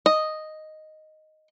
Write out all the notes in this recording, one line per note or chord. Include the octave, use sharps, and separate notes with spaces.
D#5